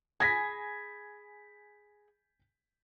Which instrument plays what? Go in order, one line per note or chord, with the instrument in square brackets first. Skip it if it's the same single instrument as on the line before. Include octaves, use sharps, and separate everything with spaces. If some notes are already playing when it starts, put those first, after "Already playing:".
[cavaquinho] G#4 G#5 B5 [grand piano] G#6 A#6 B6